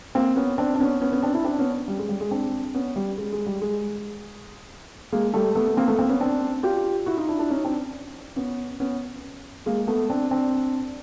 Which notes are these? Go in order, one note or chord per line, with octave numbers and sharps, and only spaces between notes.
A#3 C4
B3 C#4
C4 D4
D4
B3 C#4
B3 C#4
B3 C#4
C4 D4
D4 E4
C4 D4
B3 C#4
G3
G#3
G3
G#3
C4 D4
B3 C#4
G3
G#3
G#3
G3
G#3
G#3 A#3
G3 A3
A3 B3
B3
A#3 C4
A3 B3
A#3 C4
B3 C#4
C4 D4
F4 G4
E4 F#4
D#4 F4
D4 E4
D4 E4
C#4 D#4
C4 D4
B3 C#4
B3 C#4
G#3 A#3
A3 B3
C4 D4
C4 D4